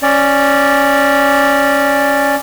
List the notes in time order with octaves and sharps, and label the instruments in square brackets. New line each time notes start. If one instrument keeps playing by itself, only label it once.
[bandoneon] C#4 D5